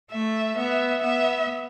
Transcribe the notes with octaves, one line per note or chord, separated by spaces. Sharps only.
A3 E5
B3 E5
B3 E5